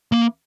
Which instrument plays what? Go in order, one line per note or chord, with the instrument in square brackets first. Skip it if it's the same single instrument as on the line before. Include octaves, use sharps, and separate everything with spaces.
[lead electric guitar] A#3